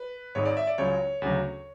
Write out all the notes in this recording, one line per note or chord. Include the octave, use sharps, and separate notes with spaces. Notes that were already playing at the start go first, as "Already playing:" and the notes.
Already playing: B4
G#1 G#2 G#3 C#5
D5
E5
D5
C#2 C#3 F#3 C#5
D2 C#3 F#3